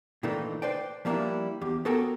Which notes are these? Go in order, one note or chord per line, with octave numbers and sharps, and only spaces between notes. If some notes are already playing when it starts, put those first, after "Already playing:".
A#2 D#3 E3 A3 D4 D#4
B4 C5 D5 G5
F3 G3 A#3 C4 D4 E4
E2 G4
B3 F#4 A4 A#4 G5 G#5